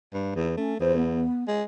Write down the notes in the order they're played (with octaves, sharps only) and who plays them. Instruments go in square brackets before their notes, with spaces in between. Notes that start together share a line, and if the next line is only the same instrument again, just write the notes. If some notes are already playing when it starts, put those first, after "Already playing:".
[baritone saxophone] G2
E2
[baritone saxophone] A3 [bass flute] C#4
[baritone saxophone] E2 [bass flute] C5
[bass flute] B3
[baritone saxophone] G#3